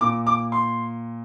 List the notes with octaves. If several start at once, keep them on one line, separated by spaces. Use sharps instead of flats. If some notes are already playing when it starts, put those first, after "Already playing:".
A#2 D6
D6
C6